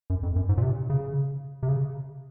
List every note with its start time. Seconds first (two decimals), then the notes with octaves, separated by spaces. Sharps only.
0.10 F#2
0.23 F2
0.36 F#2
0.49 G#2
0.58 A#2
0.62 C3
0.90 C#3
1.63 C3
1.68 C#3